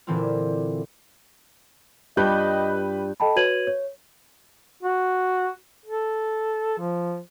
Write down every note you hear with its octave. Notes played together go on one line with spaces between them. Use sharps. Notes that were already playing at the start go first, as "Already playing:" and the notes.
A#2 D3 E3 C4 E4 F4
G2 F4 G4 B4 D#5 F#6 G6
A4 D#5 G5 A5 B5
F#4 B4 C#5 G#6 D#7 F#7
C#5
F#4
A4
F3